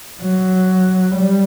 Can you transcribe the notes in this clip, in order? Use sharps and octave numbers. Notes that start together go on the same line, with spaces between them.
F#3
G3